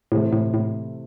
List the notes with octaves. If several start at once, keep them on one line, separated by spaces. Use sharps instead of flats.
A2 C3 E3 A3
A2
A2